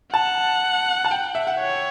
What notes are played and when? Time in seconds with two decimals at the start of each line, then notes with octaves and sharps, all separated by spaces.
0.14 F#5 A5
1.05 A5
1.11 G5
1.35 E5
1.47 F#5
1.60 C#5